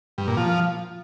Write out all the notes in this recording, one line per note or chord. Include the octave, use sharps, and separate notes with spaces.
G2
A#2
F3